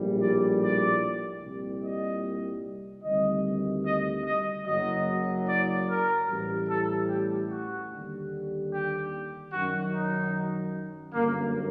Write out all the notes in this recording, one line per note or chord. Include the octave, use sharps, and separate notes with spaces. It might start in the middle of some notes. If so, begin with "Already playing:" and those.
Already playing: A#1 A2 G3
D5
D5
C2 A#2 G3
D#5
D2 C3 D#3 G3 D#5
D#5
D#5
F#1 F#2 F#3 D#5
D5
A#4
A1 A2 G3
A4
G4
F#4
D#2 D3 G3
G4
F#2 D#3 F#3 F#4
D#4
G1 F#2 D3 A#3